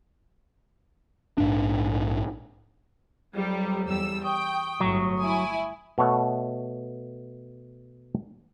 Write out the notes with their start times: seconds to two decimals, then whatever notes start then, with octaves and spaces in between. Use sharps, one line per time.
1.38 A#1 G#2 D4
3.35 F2 F#3 G3
3.87 E2 G3 E6
4.24 G5 C#6 D#6
4.80 G1 A2 F#3
5.21 E4 G#5
5.98 B2 A3 C#5 F#5